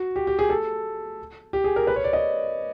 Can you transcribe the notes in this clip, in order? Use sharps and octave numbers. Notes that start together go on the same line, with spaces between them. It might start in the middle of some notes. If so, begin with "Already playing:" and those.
Already playing: F#4
G4
G4
G#4
A4
G4
G#4
A#4
B4
C#5
D5
D#5